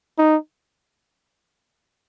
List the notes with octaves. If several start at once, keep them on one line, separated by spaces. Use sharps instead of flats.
D#4